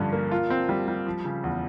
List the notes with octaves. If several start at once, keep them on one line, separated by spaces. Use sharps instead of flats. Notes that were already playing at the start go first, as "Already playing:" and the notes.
Already playing: G2 D3 F3 C#4
A#3
F4
C4
G3
G3
F3
C#3
E2